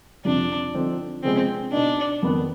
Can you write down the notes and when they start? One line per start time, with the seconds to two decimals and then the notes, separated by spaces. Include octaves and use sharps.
0.25 F2 C3 F3 D4
0.75 D3 F3 C4 D#4
1.23 C3 F3 G#3 B3 C4 D4
1.72 B2 B3 D4 D#4
2.23 F2 D#3 B3